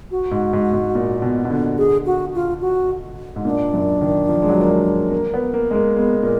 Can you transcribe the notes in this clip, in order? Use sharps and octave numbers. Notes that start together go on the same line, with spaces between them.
F#4
G#2
G#2
G#2
A#2
B2
B2
D3
G#4
F#4
F4
F#4
G#2
A#2 D4
F#2
D#3
F3
G#3
F#3
A#3
G#3
A#3
B3
A#3
G#3
A#3
G#3 B3
A#2 A#4